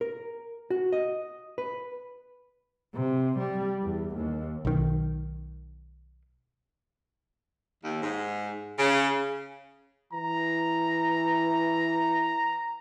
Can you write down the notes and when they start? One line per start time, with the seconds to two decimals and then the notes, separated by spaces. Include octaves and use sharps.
0.01 A#4
0.70 F#4
0.93 D#5
1.58 B4
2.94 C3
3.39 G3
3.83 E2
4.15 D#2
4.65 B1 D#3
7.83 D#2
8.02 G#2
8.79 C#3
10.13 E3 A#5